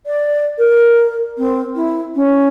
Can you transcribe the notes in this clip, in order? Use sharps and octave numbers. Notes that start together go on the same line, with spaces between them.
D5
A#4
C4
E4
C#4